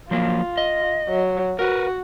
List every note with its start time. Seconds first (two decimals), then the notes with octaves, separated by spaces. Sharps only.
0.11 F3 F#3 A#3 F4
0.58 D#5
1.09 F#3
1.59 F#4 A#4 B4